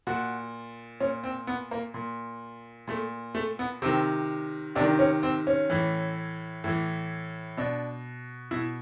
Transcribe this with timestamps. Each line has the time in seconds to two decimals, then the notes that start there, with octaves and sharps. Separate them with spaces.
0.07 A#2 F#4
1.00 A#2 C#4
1.24 C4
1.47 B3
1.71 A#3
1.94 A#2
2.88 A#2 A3
3.35 A3
3.59 B3
3.82 C3 D#3 C4
4.75 C3 D4
4.81 D#3
4.99 C#4
5.23 C4
5.47 C#4
5.70 A2 E3
6.64 A2 E3
7.57 B2 D4
8.51 B2 E4